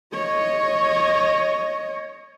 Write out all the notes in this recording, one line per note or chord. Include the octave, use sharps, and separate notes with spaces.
C#5 D#5